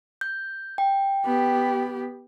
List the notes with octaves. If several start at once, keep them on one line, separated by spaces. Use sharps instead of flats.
G6
G5
B3 G4